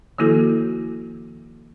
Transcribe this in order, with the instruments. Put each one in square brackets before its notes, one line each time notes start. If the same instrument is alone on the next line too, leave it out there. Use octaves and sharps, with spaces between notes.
[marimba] D#3 F3 A#3 E4 F#4 A4